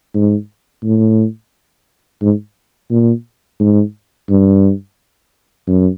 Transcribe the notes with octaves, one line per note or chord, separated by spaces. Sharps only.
G#2
A2
G#2
A#2
G#2
G2
F#2